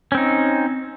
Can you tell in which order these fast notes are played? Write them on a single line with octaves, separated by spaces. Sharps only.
C#4 C4 D#4